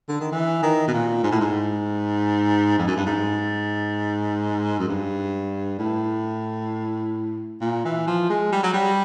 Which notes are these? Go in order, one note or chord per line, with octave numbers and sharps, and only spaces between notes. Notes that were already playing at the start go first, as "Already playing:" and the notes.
D3
D#3
E3
D#3
B2
A#2
G#2
A2
G#2
F2
F#2
G2
G#2
F#2
G2
A2
A#2
E3
F3
G#3
G3
F#3
G3